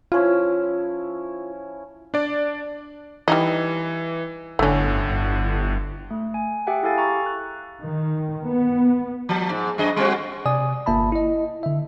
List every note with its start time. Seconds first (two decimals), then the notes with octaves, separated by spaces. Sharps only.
0.12 F3 C#4 E4 F4
2.14 D4 D5
3.28 E3 G3 D#4 D#5
4.59 G1 A2 D3 A3 C#4
5.09 G1
6.11 A3
6.34 G#5
6.67 G4 G#4 E5 F#5 G5
6.83 E4 G4 A4 F5 G#5 A6
6.98 A#5 C#6 A6
7.26 F#6
7.81 D#3
8.45 B3
9.29 F3
9.50 G#2
9.78 F#2 G#4 D#5
9.96 G3 C4 F#4
10.46 C3 D5 G#5 D#6
10.86 G1 A#3 E5 A5 B5
11.12 E4 D#5
11.63 D3 E5